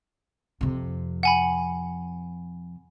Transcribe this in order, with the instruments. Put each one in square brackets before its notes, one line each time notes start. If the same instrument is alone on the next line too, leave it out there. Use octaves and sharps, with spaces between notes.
[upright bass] F2 C3
[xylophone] F#5 G#5 B5